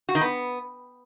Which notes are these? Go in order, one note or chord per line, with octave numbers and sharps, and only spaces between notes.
F#4
D#3
B3